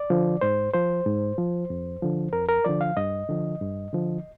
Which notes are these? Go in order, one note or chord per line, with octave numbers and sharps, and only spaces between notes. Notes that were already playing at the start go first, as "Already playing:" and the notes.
Already playing: D5
D3 F3
G#2 C5
F3 C5
G#2
F3
F2
D3 F3
F2 A#4
A#4
D3 F3 D5
F5
G2 D#5
D3 F3
G2
D3 F3